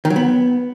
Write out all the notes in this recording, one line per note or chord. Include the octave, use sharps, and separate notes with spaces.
D#3
F#3
B3